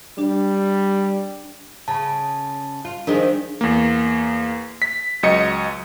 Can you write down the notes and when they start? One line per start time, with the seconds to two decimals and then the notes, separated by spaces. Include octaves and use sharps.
0.18 G3 D4 G4
1.88 C#3 A5
2.85 F4
3.07 D#3 F3 G#3 D4
3.61 E2 A#3
4.82 B6
5.23 C#2 F#3 D#5 C#7